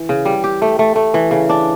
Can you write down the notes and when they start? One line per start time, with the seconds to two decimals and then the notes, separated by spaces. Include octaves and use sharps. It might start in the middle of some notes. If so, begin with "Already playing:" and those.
Already playing: E3
0.09 C#3
0.25 G3
0.44 G4
0.62 A3
0.79 A3
0.96 A3
1.14 E3
1.31 C#3
1.49 D4